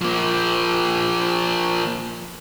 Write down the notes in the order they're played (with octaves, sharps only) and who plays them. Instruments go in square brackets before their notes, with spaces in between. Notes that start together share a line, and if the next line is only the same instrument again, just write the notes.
[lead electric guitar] F3 A#3